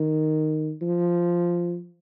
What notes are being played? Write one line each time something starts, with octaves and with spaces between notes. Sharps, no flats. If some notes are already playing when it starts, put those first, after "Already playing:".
Already playing: D#3
F3